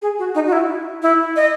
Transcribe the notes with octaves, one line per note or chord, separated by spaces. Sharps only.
G#4
F#4
D#4
F#4
E4
E4
D#5